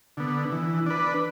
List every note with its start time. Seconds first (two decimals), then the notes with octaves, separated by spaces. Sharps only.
0.17 D3 B3
0.52 E3
0.86 D4 B4